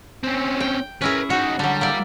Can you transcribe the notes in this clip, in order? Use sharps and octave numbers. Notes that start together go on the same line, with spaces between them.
C4 C#4
G5
C#4 E4 G#4 A#4 B4
D#4 F#4 C#5
D3 F#3 G3
A#3 E4 D5